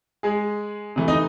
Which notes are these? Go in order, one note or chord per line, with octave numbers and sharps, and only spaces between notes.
G#3 G#4
C3 E3 A3
D#4 D#5